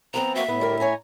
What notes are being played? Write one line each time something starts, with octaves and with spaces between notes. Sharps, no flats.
F3 B3 C4 A#5
A#3 F#4 E5
A2 B3 E4
D2 G3 A#4
C#5 G#5 A#5